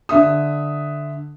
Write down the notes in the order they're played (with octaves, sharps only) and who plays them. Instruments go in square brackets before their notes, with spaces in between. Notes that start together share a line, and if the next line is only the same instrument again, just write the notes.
[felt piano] D3 E5 D#6